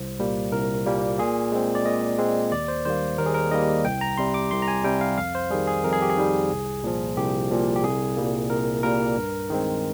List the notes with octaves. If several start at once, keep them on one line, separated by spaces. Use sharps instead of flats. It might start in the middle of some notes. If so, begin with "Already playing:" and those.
Already playing: C2 C5
A#2 G3 A#3
C2 A#4
A#2 G3 A#3
A#2 G#4
G#3 C4
D5
A#2 D#5
G#3 C4
D#2 D5
C5
D#3 G3 A#3 C5
D#2 A#4
G#4
A#4
D#3 G3 A#3 D#5
C2 G5
A#5
C3 G3 C6
D6
C2 C6
A#5
G#5
C3 G3 G5
F5
F2 F5
C5
D#3 G3 G#4
G#4
F2 A#4
G#4
G4
G#4
D#3 G3
C2
A#2 F3
C2 G4
A#2 F3
G4
C2 G#4
A#2 G3 A#3
C2 A#4
A#2 G3 A#3 A#4
G2
D#3 G#3 C4